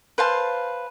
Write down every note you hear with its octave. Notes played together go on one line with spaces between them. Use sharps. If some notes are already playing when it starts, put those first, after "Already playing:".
B4 C5 F5 A5